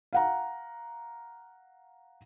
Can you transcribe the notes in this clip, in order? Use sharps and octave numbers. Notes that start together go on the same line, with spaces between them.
F5 F#5 A#5